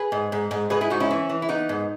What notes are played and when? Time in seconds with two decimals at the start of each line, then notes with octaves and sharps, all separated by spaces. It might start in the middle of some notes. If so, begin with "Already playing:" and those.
Already playing: G#4 B4
0.12 G#2
0.32 G#2
0.51 G#2
0.70 G#2 G#4 B4
0.81 E4 G#4
0.90 G#2 D#4 F#4
1.00 C#4 E4
1.10 E3
1.29 E3
1.42 E4
1.49 B3 D#4
1.69 G#2